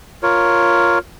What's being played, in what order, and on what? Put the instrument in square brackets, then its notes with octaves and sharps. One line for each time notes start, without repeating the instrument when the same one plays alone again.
[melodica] F4 A#4 C#5